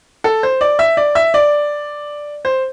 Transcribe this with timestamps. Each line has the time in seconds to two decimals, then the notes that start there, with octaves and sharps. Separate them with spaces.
0.24 A4
0.43 C5
0.61 D5
0.79 E5
0.97 D5
1.15 E5
1.34 D5
2.45 C5